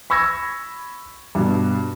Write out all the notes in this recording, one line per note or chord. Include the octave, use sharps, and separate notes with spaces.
B5 C#6 E6 G#6 A#6
G2 B2